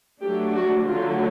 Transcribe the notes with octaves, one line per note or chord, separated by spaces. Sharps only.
F#3 A3 D4 G4
F#4
D3 F#3 A3 F4